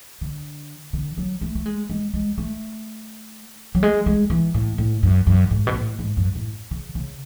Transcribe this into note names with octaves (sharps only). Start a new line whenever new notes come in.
D3
D3
F#3
A3
A3
G#3
G#3
G#3
A3
F#3
G#3
G#3
E3
A2
A2
F#2
F#2
G#2
B2
A2
G#2
F#2
A2
C#3
C#3